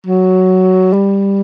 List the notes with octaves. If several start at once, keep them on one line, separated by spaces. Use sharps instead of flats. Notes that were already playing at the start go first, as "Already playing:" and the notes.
F#3
G3